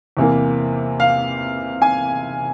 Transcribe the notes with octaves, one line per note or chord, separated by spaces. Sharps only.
E2 C3 E3 A#3
F5
G#5